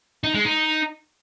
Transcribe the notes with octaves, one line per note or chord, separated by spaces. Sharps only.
D#4
G#3
D#4